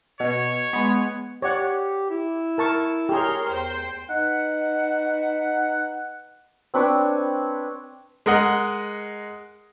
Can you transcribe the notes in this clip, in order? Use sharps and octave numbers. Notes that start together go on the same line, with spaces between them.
B2 C#5
G#3 B3
G4 C#5 D5 F#5
E4
A#4 A5 C#6
G4 G#4 A#4 C#5 C6
E2 C5 G5
D#4 B4 F#5
C4 D4 B4 C#5
G#3 A#4 D#5 F#5